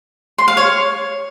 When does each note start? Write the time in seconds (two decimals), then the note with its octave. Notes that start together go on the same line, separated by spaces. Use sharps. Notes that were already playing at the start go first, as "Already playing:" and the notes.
0.38 C6
0.48 F5
0.57 C#5